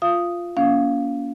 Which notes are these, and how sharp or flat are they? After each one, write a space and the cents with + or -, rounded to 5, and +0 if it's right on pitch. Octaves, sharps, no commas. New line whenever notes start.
F4 +0 F5 -25 D#6 +0
A#3 +25 C#4 +30 F5 +0